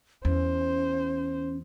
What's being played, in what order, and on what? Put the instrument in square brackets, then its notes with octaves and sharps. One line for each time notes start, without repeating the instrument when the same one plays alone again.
[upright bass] E2 [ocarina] C#4 [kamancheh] C5